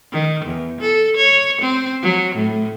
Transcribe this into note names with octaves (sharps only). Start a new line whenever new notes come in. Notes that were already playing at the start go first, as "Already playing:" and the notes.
D#3
E2
A4
C#5
C4
F#3
A2